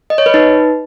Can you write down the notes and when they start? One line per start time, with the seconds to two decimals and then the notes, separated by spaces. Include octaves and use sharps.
0.10 D#5
0.18 C#5
0.26 B4
0.34 D#4